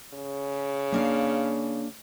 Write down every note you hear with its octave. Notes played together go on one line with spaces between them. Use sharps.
C#3
A#3 D4 F5